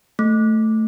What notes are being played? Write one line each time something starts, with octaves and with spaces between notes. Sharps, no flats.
A3